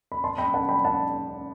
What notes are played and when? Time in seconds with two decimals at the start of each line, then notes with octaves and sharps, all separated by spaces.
0.12 B5
0.24 A5 C6
0.38 G5 B5
0.54 F#5 A5
0.69 G5 B5
0.84 F#5 A5